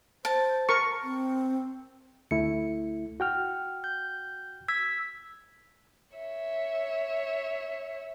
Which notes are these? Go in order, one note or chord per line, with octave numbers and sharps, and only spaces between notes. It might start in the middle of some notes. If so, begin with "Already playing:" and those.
C5 A5
A#4 C#6
C4
D2 A3 E4 C#7
F#4 G5 F6
G6
E6 G#6 B6
C#5 E5